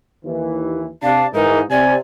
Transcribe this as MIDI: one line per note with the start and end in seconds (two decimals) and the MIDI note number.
0.24 0.88 39
0.24 0.88 52
1.03 1.24 48
1.03 1.24 62
1.03 1.27 77
1.03 1.27 81
1.34 1.61 44
1.34 1.61 52
1.34 1.60 63
1.34 1.61 70
1.70 1.97 48
1.70 1.97 74
1.70 1.94 80